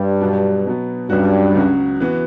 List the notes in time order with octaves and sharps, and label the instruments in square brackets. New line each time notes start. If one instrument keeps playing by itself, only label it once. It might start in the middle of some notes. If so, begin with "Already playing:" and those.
Already playing: [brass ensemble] G2 G3
[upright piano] B2 F#3 B3
B2 F#3 B3
[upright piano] C#2 C#3 F#3 C#4 F#4 [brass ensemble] G2 G3
[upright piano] C#2 C#3 F#3 C#4 F#4
E3 B3 F#4